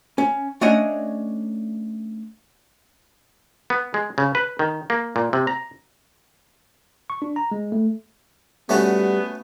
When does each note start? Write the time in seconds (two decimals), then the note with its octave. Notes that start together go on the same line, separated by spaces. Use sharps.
0.18 C#4
0.61 A3 C#4 D4 C#5 D#5 F#5
3.70 B3
3.94 G#3
4.18 C#3
4.35 B4
4.59 D#3
4.90 A#3
5.16 A#2
5.33 C3
5.47 A#5
7.10 C#6
7.22 D4
7.36 A#5
7.51 G#3
7.72 A3
8.69 G3 A3 B3 C#4 F#4